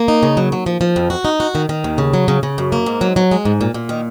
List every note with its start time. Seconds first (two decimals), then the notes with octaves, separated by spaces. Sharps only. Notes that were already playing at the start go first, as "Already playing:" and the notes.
Already playing: A#3
0.08 D#4
0.23 C#3
0.37 F#3
0.52 F#3
0.66 F3
0.81 F3
0.96 F2
1.10 F#4
1.25 D#4
1.40 F#4
1.55 D#3
1.69 D#3
1.84 D#2
1.98 C#3
2.14 F#3
2.28 C#3
2.43 C#3
2.58 F#2
2.72 A#3
2.86 G#2
3.01 F#3
3.16 F#3
3.31 G#3
3.45 G#2
3.61 A#2
3.74 A#2
3.89 D#3